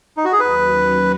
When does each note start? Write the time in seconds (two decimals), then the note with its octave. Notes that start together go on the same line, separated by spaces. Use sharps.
0.17 D#4
0.25 F#4
0.32 G#4
0.40 D#2 D#3 F#3 C#4 F#4 B4